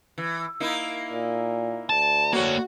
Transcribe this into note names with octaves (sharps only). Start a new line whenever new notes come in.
E3
A#3 D#4 E4
A#2
D2 A5
A#3 F#4 C#5